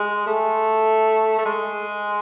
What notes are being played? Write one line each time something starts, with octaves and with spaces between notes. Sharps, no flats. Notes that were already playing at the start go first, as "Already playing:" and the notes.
Already playing: G#3
A3
A3
G#3